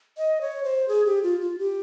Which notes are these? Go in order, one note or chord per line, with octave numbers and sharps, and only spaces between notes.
D#5
C#5
C5
G#4
G4
F4
F4
G4